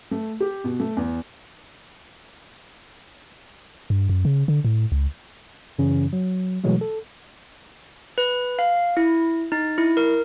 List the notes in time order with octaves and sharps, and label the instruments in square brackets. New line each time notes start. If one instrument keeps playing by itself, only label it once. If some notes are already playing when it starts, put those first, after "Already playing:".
[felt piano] A3
G4
B2
A3
E2
[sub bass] G2
F#2
C#3
D3
A2
C#2
[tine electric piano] F#2 C#3 E3 C#4
F#3
B2 E3 F#3 G#3 A3
A4
[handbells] B4
F5
E4
D#4
E4
A#4